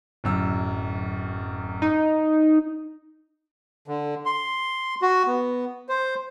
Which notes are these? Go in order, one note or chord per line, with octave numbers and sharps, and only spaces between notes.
D1 F#2 E6
D#4
D3
C6
F#4
B3
C5